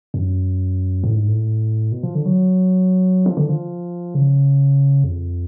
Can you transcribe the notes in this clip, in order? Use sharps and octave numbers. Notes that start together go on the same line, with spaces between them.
F#2
A2
G#2
A2
B2
F3
D3
F#3
F3
D3
F3
C#3
F2